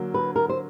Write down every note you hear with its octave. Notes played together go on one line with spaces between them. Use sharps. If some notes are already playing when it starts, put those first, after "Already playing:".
Already playing: D3 F#3 A#3
B4
A#4
C5